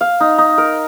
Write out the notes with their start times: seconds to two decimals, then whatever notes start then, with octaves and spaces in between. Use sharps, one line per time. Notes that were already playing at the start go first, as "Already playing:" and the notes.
0.01 F5
0.20 D#4
0.38 D#4
0.58 A#4